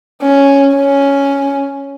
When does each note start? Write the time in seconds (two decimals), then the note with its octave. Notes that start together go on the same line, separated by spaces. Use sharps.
0.22 C#4
0.75 C#4